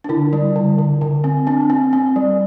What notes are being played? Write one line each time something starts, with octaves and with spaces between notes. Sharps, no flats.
D4
D3 E4
G3
D3
D3
D3
C4
C4 D4
C4
C4
G3